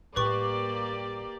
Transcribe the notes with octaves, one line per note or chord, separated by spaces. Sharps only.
A2 G3 A#3 G4 B4 D5 C#6